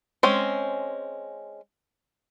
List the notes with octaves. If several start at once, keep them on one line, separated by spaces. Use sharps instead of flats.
G#3 C4 C#4